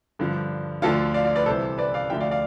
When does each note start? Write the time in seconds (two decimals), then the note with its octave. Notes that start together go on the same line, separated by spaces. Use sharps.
0.19 G2 D3 F3
0.82 D2 D3 F3 F4 A4
1.14 D5 F5
1.25 D5 F5
1.36 B4 D5
1.46 C2 C3 E3 A4 C5
1.78 B4 D5
1.94 D5 F5
2.10 D2 D3 F3 E5 G5
2.20 D5 F5
2.31 D5 F5